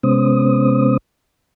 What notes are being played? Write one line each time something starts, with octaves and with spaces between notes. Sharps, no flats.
C3 G#3 B3 C#4 C5 D#6